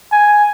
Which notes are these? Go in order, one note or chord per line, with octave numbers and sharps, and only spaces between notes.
G#5